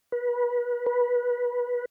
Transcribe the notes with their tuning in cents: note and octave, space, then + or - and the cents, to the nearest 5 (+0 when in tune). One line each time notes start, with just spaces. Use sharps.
B4 -30
B4 -20